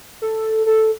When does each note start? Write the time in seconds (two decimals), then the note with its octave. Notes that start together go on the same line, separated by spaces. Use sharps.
0.22 A4
0.66 A4